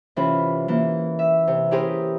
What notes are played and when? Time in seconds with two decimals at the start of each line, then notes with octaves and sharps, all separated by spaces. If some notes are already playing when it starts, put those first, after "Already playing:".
0.16 C3 E3 C#4 F4 B5
0.68 E3 A#3
1.19 E5
1.47 C3
1.71 C#4 E4 G4 G#4 A#4 C5